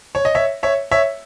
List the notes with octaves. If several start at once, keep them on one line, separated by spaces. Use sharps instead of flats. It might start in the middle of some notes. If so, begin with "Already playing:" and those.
C#5
D#5
C#5 E5
C#5 E5
C#5 E5